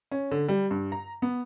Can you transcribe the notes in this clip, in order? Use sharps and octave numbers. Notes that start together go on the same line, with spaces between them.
C#4
D3
G3
G2
A#5
B3